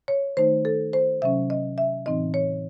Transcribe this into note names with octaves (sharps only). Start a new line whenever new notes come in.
C#5
D#3 A3 D#4 C5
A4
C5
C3 F#3 C#4 E5
D#5
E5
A2 E3 C4 D#4 D#5
C#5